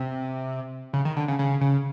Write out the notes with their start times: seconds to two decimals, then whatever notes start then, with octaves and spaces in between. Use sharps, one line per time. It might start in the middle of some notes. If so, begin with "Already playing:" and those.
Already playing: C3
0.93 C#3
1.05 D#3
1.16 D3
1.28 C#3
1.39 C#3
1.61 C#3